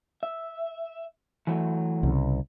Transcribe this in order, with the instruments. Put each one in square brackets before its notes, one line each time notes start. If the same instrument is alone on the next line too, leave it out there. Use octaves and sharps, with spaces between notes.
[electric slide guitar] E5
E3 F#3 A3
[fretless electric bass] C2 C#3